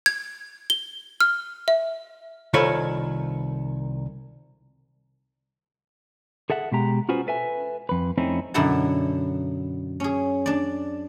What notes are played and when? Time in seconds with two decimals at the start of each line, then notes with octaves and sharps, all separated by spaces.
0.06 G#6
0.70 G7
1.21 F6
1.68 E5
2.54 C2 D#3 F4 A4 C#5 B5
6.50 G#4 A4 E5 F#5
6.72 B2 G#3 G4 A#5
7.09 C#4 F4 F#4 G#4 B4 C5
7.27 A4 B4 E5 G#5
7.89 F2 B4
8.18 F2 A3 C4 C#4 D#4 E4
8.54 F#2 B2 D3 E4 F#5 A5
10.00 C#4 G#4
10.46 D4 D5